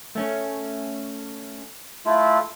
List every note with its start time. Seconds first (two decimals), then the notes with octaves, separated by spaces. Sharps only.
0.15 A3 C#4
2.06 A3 E4 F4